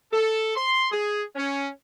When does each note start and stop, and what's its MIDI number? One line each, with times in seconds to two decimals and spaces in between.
0.12 0.53 69
0.56 0.87 84
0.91 1.22 68
1.35 1.67 61